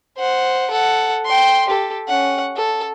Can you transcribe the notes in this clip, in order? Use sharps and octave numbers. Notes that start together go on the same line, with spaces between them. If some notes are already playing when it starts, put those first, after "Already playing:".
C5 F#5
A4 F#5
G5 C6
G4 A4
C#4 F#5
A4